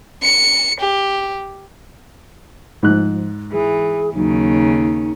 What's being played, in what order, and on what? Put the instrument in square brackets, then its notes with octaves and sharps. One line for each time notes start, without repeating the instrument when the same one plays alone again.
[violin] C#7
G4
[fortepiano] G#2 F#6 [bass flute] F3
[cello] E3 [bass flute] G#4
[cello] D#2 C#3 [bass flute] F#3 [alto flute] D#4